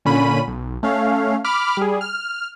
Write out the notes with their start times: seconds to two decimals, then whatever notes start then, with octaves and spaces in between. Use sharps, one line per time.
0.05 A#2 D3 C#4 B5 D#7
0.48 B1
0.83 A3 C#4 F5
1.44 B5 D6 F6
1.77 G3 G#4
2.01 F6